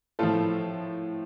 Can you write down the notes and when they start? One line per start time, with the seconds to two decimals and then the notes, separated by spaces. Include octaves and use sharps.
0.19 A2 F3 F4 A4